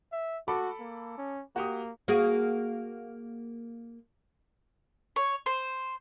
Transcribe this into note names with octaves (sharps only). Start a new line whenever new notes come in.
E5
F#4 A4 B5 D6
A#3
C#4
A#3 F#4 G4 D#6
A#3 F#4 G#4
C#5
C5